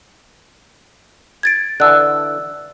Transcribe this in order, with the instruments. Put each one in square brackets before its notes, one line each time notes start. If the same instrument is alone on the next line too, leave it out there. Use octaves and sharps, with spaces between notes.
[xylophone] G#6 A6 D7
[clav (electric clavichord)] D3 E3 [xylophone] E6 F#6